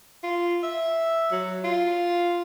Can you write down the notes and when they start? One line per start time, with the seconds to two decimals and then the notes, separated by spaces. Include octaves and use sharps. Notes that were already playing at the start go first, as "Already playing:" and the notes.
0.24 F4
0.63 E5
1.31 F#3
1.64 F4